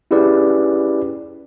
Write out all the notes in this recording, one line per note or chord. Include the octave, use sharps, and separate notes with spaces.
C#4 E4 G4 G#4 B4 D5